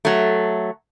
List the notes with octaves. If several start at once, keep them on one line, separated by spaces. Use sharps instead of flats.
F#3 A3